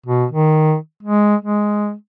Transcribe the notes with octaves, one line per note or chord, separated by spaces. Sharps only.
B2
D#3
G#3
G#3